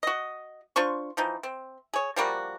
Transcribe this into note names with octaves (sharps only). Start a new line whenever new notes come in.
F#4 D#5
D4 F4 C5 C#6
E3 F3 D#4
C4
G#4 C#5
F3 G3 A#3 F#4